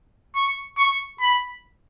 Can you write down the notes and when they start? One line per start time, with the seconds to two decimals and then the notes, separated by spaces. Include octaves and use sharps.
0.35 C#6
0.77 C#6
1.20 B5